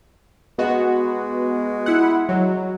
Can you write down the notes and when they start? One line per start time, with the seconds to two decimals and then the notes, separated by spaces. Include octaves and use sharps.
0.59 G#3 B3 F#4
1.86 E4 F#5
2.29 F#3